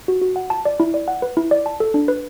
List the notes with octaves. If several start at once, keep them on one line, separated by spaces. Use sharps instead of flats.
F#4
F#4
F#5
A5
D5
E4
D5
F#5
B4
E4
D5
A5
A4
D4
B4